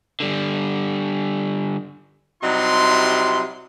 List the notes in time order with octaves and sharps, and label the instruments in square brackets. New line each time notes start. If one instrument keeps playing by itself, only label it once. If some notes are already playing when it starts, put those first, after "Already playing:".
[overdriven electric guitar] D3 G3
[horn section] C3 F#3 G3 D#4 E4 C6